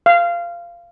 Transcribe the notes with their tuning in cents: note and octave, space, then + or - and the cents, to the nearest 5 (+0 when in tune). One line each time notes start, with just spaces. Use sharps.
F5 -15